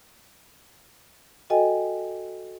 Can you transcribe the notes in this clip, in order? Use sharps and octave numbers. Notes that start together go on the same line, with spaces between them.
F#4 A4 D#5 G5 G#5